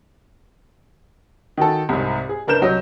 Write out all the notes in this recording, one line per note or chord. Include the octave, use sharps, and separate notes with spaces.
D#3 F#4 A4
C2 G#2
G#4
F#1 D4 A#4 B4 G6 E7
C2 F#3 D#5